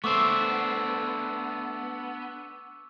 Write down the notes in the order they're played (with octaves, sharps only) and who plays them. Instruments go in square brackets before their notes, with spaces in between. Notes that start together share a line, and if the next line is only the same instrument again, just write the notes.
[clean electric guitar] A3 C5 [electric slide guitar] B3 D4 [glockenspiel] C#6 D6 E6